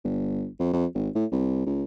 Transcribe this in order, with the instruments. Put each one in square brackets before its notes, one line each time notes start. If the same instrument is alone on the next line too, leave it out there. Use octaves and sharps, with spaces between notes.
[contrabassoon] G1
F2
F2
G#1
A2
C2
C#2